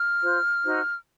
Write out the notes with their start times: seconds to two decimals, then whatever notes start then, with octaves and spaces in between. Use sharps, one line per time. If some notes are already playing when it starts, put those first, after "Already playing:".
Already playing: F6
0.23 F4 C5
0.64 D#4 F#4 C5